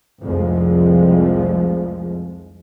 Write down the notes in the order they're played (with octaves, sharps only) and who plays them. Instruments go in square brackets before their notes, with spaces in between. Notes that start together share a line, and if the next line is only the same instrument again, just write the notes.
[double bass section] F1 C2 F2 F3 G#3